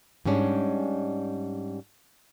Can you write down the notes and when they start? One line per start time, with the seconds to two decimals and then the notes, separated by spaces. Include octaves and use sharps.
0.25 G#2 G3 G#3 C#4 D4